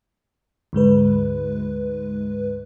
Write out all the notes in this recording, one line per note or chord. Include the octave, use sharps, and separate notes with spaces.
D2 G#2 G#3 B4